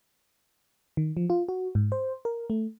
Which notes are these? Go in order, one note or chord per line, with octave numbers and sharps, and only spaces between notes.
D#3
F3
F4
F#4
G#2
C5
A#4
A3